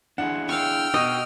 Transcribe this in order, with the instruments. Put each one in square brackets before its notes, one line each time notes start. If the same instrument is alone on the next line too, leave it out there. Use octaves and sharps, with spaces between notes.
[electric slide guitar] D4 E4 G#4 [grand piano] F#5
[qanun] F5 C#6 [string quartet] G5 E6 F6
[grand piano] B2 [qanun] D#5